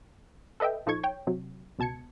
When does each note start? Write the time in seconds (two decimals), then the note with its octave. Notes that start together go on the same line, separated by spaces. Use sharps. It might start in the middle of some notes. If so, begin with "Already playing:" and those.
0.60 A4 B4 D#5 E5 G5
0.86 A#1 F3 D#4 A4 C#6 G#6
1.03 C#5 G5
1.27 C3 F#3
1.79 C#2 B2 A5 G#6 C#7